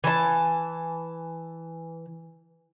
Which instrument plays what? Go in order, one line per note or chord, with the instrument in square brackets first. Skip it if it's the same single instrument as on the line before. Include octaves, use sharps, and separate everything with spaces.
[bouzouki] E3 A5